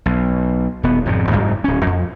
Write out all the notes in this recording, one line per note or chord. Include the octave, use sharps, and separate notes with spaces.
B1
D#1 B3
G#1 F2 C3
F#1 D#2 G#2 G3
D1 C#4
F2